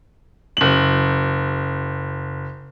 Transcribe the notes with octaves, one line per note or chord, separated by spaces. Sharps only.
F#1 F#7